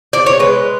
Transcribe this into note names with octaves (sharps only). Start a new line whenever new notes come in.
D5
C#5
G#3 B4